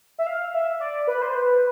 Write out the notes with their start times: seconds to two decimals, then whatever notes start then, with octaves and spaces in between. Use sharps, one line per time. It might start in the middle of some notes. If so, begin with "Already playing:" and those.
0.19 E5
0.26 F5
0.54 E5
0.80 D5
1.07 B4
1.22 C5
1.35 B4